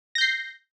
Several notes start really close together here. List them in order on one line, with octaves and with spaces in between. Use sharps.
A#6 G6 C7